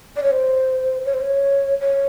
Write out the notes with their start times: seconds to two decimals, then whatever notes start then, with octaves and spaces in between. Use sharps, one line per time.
0.16 D5
0.23 C#5
0.31 C5
1.05 C#5
1.14 C5
1.21 C#5
1.80 C#5